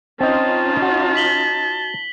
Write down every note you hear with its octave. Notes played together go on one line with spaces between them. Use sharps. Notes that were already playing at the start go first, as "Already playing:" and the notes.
C4 C#4 D#4 F4 D#5 A5
F#4
B6 F#7 G7